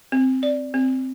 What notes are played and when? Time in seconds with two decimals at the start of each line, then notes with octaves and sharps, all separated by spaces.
0.12 C4
0.43 D5
0.74 C4